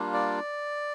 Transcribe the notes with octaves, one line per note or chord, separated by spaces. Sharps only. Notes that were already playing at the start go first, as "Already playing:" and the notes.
Already playing: G3 A#3 D4 F4
D5